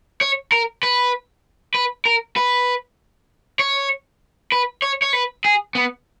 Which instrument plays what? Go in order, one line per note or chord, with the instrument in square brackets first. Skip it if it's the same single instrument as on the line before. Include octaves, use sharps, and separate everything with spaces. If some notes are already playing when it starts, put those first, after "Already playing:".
[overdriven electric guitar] C#5
A#4
B4
B4
A#4
B4
C#5
B4
C#5
C#5
B4
G#4
B3